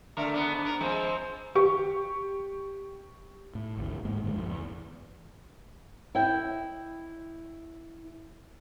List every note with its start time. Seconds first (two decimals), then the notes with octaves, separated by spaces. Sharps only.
0.17 D3 A3 A#4
0.34 B3 D4
0.52 G#2
0.65 A#4 B4
0.81 F3 G#3 C4
1.55 G4 C#6
3.55 A2
3.77 G#1 D2 E3
4.05 G#2 G#3 A#3
4.24 G2 D3 G#3
4.35 A#1 F2 E3
4.48 E2
6.15 E4 D#5 G5